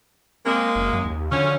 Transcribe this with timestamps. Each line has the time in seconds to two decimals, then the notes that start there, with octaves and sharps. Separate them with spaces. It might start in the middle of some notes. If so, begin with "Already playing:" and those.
0.46 G#3 A#3 C4
0.76 F#1
0.93 F#2
1.05 D#2
1.32 D3 F3 F#3 C#4